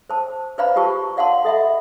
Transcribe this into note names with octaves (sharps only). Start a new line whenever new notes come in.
C5 A5
B4 C5 D5 F5 A#5 B5
F4 G4 A5 C#6
D5 F5 F#5 A5 C6
A4 D#5 E5 F#5 B5